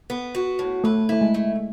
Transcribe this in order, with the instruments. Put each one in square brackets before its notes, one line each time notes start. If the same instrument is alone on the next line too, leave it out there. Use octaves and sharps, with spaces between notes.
[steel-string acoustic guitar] B3
F#4
A2
[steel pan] A3 [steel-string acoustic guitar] B4
[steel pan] A3 [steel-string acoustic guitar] E4
[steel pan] G#3
[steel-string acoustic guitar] A3